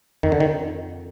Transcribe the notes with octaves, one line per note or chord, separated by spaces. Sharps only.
F2 D#3
D3
D#3